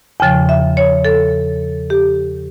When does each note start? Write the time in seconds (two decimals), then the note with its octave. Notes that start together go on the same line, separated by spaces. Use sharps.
0.20 E2 C#3 F3 G5
0.49 E5
0.77 C#5
1.05 A4
1.90 G4